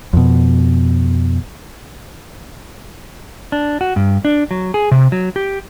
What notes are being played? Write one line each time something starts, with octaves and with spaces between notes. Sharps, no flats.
F2 B2
D4
F#4
G2
D4
F#3
G#4
C3
F#3
G4